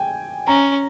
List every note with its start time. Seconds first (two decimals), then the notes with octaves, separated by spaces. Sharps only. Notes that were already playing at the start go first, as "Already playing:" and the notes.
Already playing: G5 G#5
0.47 C#4 A#5